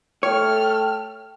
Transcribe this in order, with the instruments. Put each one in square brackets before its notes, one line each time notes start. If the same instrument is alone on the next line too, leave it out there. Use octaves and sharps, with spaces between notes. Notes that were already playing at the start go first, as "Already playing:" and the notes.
[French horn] A3 [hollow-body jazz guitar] C#5 [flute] G5 [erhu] F6